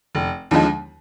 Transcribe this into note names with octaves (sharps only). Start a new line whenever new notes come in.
F1
D#2 D3 F3 G#3